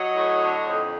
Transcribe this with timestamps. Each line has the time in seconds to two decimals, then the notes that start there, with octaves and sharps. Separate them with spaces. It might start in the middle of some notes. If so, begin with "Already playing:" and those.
Already playing: F#3 C#5 D#5
0.16 A2
0.41 D3
0.67 F2